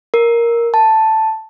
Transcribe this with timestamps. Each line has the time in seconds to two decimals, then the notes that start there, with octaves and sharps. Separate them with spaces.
0.14 A#4
0.74 A5